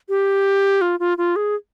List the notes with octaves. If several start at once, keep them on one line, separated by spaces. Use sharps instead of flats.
G4
F4
F4
F4
G#4